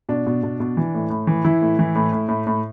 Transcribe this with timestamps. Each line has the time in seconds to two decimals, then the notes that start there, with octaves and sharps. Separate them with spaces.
0.09 B2 D4
0.26 B2
0.43 B2
0.60 B2
0.77 E3
0.94 A2
1.10 A2
1.27 E3
1.45 E3 E4
1.62 A2
1.79 E3
1.95 A2
2.12 A2
2.29 A2
2.47 A2